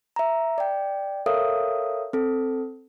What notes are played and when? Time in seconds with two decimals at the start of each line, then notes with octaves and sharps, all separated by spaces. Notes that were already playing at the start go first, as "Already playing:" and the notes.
0.16 E5 A#5
0.58 D5 G5
1.26 A4 A#4 C#5 E5 F5 D#6
2.13 C4 A4